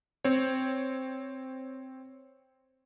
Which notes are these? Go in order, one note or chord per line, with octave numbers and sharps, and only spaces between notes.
C4 C#5